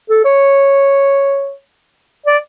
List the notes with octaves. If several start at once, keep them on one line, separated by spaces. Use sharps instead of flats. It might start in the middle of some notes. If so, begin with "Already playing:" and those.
A4
C#5
D5